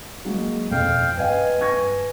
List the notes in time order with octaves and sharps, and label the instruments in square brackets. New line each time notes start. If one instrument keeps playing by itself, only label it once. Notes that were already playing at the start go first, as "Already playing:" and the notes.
[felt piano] F#3 G#3 A#3
[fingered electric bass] D#1 B2 C4 [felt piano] F2 [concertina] F5 G5
[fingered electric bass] G2 [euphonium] B4 [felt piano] D#5 F5 G5 [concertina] G#5
[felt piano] C#6 G#6 A#6